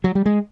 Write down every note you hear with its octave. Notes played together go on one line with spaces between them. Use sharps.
F#3
G3
G#3